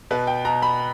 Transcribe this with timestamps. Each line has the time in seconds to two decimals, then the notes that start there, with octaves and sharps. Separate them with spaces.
0.11 B2 B4
0.27 G5
0.45 B2 A#5
0.62 B5